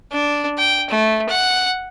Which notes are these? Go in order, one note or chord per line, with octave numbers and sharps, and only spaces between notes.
D4
G5
A3
F#5